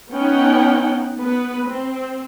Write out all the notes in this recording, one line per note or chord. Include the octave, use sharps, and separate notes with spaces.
B3 C#4 D#4 F#5 G5
B3 B4
C4